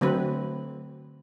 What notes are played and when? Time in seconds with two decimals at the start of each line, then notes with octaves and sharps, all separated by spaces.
0.01 D3 F#3 A3 C4 B4